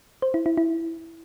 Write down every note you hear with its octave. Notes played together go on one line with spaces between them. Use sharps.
C5
E4
E4
E4